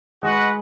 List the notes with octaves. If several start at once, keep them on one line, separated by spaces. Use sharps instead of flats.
G#3 F#4 B4 D#5 F#5